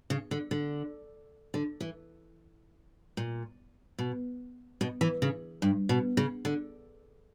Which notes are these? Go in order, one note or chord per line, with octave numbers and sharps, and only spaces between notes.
C#3
D3
D3
D3
E3
A#2
B2
B2
E3
C#3
G2
B2
C#3
D3